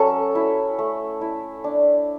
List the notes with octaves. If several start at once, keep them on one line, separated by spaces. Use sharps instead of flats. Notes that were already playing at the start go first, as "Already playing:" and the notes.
Already playing: F#3 C#4 A4
E4
A3
E4
D4